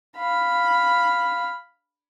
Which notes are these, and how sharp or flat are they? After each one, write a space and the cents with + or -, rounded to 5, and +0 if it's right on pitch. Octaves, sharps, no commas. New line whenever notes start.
F5 +0 B5 +0